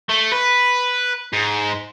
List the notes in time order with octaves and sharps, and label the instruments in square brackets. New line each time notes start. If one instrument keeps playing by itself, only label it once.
[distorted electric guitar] A3
B4
G#2